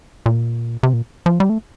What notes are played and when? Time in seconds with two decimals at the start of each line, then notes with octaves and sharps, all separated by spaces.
0.26 A#2
0.83 C3
0.93 A#2
1.26 F3
1.40 G3
1.49 A3